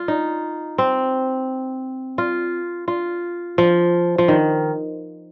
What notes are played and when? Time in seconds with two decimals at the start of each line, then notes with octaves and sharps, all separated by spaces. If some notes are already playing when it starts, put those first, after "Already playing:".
Already playing: F4
0.08 D#4
0.78 C4
2.18 F4
2.88 F4
3.58 F3
4.18 F3
4.28 D#3